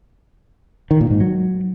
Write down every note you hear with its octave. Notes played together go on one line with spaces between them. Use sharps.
D#3
A#2
G#2
F#3